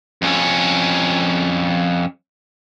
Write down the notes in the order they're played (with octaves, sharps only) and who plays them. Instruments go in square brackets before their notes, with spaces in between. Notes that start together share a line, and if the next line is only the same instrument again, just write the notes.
[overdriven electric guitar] F2 C#4